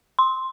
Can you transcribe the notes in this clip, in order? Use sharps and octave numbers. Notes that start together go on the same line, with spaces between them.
C6